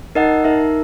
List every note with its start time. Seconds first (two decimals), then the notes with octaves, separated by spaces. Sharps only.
0.15 D#4 A#4 D#5 F#5
0.44 D#4 A#4 E5